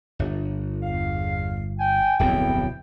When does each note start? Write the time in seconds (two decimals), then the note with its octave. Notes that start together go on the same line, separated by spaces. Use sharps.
0.19 G1
0.83 E2 F5
1.79 G5 G#5
2.19 D1 B1 F2 C4 E4 G5